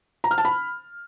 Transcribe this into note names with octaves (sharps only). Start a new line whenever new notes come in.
A#5
F6
A5
B5